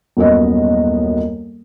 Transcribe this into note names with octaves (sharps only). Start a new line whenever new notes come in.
D#1 F#2 B3 D#5